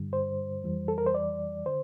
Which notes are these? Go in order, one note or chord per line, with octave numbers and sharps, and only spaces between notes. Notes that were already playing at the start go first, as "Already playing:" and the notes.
Already playing: G2 D3 G3
C5
F2 E3 G3
A4
A#4
C5
D5
D3 C5